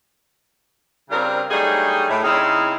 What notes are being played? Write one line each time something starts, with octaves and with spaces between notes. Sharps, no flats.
C#3 G3 C4 D4 F4 A#4
F#3 G3 A3 D4 D#4 G#4
A2
C#3 C4 D#4 E4 G#4 F5